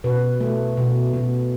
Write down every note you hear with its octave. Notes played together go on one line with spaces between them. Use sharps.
B2 B4
A3
B2
B2